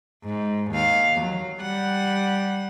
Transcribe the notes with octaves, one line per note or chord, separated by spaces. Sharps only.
G#2
D#2 F5
F#3
G3 F#5